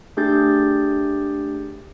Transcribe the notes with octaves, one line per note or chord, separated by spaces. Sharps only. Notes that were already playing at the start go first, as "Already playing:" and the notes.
A3 D4 G4 G#4 G6 A6